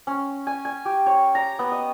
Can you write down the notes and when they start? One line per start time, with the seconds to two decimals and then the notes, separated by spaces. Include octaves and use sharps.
0.07 C#4
0.47 G#5
0.65 G#5
0.85 G4
1.06 C#5
1.35 A#5
1.59 B3
1.72 D#5